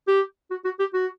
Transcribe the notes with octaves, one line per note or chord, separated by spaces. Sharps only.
G4
F#4
F#4
G4
F#4